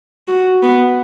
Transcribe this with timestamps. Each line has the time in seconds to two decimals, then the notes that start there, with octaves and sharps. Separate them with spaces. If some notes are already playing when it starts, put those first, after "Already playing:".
0.28 F#4
0.62 B3